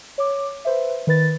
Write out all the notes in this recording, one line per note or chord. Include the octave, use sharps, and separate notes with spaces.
C#5 D6
B4 C5 E5
D#3 B4 A6